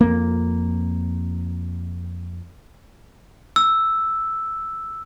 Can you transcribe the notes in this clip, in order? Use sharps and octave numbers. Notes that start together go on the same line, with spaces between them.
F2 A#3
E6